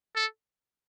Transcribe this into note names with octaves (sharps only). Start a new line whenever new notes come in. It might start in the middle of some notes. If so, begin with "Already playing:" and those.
A4